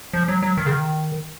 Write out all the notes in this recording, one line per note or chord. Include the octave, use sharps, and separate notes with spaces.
F3
F#3
F#3
D#3
C#3
D#3